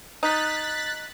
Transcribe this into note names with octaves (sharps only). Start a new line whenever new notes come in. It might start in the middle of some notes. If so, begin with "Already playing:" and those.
D#4 F#6 A6 B6